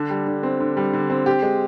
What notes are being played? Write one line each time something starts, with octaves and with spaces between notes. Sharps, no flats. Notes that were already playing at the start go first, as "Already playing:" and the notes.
Already playing: D3 D4
G3
D3
C4
D3
G3
D3
C4
G4
G#3